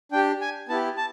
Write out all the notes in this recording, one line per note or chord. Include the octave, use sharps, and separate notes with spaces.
D4 G4 G5
G#5
B3 E4 G4 A5
A5